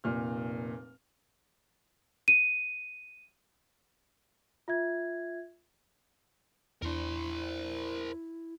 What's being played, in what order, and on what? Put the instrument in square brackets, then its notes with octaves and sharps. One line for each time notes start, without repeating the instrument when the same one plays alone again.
[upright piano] F1 A#2 F6
[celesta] D#7
F4 E5 G#6
[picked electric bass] E2 D4 [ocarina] E4 [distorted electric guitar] A#4 C5